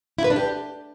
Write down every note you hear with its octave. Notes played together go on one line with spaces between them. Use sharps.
E4
B4
D4
G4